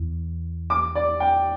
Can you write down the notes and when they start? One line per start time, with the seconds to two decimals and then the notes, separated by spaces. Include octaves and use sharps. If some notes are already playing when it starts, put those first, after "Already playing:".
Already playing: E2 E3
0.70 D6
0.95 D5
1.20 G5